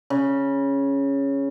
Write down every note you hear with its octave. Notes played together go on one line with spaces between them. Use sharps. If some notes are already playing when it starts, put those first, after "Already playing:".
C#3